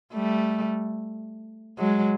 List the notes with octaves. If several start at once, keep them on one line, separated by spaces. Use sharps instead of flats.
G3 A3
F#3 G#3